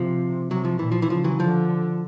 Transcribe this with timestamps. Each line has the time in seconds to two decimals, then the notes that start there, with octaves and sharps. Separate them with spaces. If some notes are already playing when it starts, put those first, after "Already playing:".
Already playing: C3 F3
0.51 C3 F#3
0.65 F3
0.79 A#2 E3
0.92 F3
1.02 E3
1.10 C#3 F3
1.24 E3 F#3
1.40 D3 F3